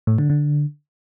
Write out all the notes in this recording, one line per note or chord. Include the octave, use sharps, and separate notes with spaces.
A2
D3
D3